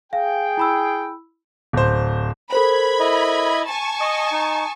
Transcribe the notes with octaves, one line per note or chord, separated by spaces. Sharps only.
G#4 F5 G5
E4 B5 E6
D1 C5
A4 A#4 C5 B5 G#6
E4 D#5
G#5 A5 C#6
D#5 D#6
D#4